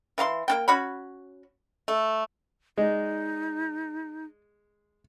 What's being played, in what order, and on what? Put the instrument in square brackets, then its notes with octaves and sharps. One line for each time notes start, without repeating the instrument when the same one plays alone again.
[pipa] E3 F5 A#5 C6
A#3 D4 G5
C#4 F#4 C#5 B5
A3
[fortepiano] G#3 [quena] D#4 [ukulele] D5 D#5